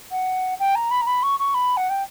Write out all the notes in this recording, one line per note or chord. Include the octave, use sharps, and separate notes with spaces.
F#5
G5
A#5
B5
A#5
B5
C#6
C#6
B5
F#5
G5